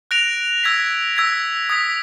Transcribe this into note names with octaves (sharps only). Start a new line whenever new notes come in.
F#6 A#6 D7 F7
E6 G#6 B6
E6 G#6 B6
D#6 G#6 B6